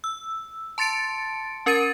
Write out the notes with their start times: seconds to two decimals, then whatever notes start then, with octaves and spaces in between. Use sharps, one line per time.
0.04 E6
0.78 A5 C6 A6 C#7 D7
1.66 C#4 A#4 G#6 A6 D#7